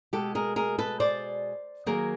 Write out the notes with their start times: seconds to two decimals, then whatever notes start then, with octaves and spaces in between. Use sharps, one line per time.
0.13 B2 G#3 G4 A4
0.35 G#4 A#4
0.56 G#4 A#4
0.78 A4 B4
1.00 C5 D5
1.86 D#3 F#3 A#3 G#4 A#4